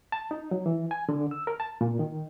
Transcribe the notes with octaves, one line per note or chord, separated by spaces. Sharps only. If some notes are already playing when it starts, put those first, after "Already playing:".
A5
D#4
F#3
E3
G#5
D3
E6
A#4
A5
A#2
D#3